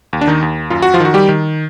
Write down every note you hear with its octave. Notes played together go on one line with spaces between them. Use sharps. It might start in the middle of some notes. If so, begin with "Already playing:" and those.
D#2
D4
D#3 D#4
D#2
F#2 F4
F#4
F3 F4
D#3 F#4
G3 G4
D#3